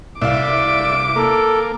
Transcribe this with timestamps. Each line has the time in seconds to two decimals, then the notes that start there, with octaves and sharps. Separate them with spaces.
0.21 C2 D5 E5 F5 D6
1.16 A#3 A4